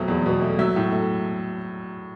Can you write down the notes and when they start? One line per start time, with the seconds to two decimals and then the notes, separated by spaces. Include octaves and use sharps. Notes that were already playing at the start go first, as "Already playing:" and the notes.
Already playing: F2 B2 F#3 A3
0.08 E2
0.26 B2
0.42 A3
0.59 F#3 E5
0.76 A2
0.92 A3